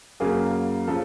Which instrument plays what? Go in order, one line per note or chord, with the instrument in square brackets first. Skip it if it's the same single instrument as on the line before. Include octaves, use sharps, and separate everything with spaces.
[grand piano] F#2 C#3 F#3 A#3 G#4
C#3 F3 A4